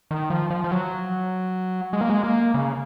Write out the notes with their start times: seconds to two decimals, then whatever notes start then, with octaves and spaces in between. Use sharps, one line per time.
0.11 D#3
0.30 F3
0.50 F3
0.64 F3
0.71 F#3
1.93 G#3
2.01 A#3
2.10 G#3
2.24 A#3
2.54 C#3